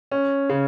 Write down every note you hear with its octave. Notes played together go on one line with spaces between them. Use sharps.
C#4
C#3